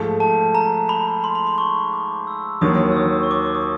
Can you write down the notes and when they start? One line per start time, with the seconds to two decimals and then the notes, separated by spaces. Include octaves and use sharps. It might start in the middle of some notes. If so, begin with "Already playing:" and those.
Already playing: G#2 F3 A3
0.20 A5
0.55 A#5
0.89 B5
1.24 C6
1.35 B5
1.47 C6
1.58 C#6
1.93 D6
2.27 E6
2.61 D#2 D#3 F#3 D#6
2.92 E6
2.97 D#6
3.23 C#6
3.31 D6
3.55 D#6